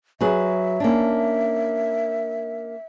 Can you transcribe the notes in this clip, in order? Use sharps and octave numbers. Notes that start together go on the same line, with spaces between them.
F#3 G#4 B4 E5
A#3 C#4 D4